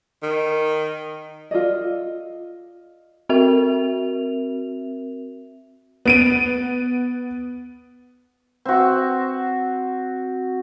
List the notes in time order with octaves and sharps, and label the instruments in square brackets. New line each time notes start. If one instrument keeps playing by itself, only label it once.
[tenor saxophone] D#3
[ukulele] F4 A4 D5 D#5
[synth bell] C4 F#4 A#4 E5 F7
[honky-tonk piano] B3 D7 D#7
[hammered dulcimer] C4 F#4